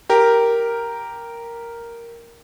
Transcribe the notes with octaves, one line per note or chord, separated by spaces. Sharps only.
G4 A#4